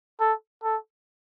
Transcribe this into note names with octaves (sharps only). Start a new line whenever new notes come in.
A4
A4